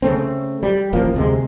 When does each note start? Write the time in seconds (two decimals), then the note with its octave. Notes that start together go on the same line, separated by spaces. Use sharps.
0.02 C#3 A3 C4
0.63 G3
0.93 D1 A1 F3 A#3
1.14 D2 C3 G#3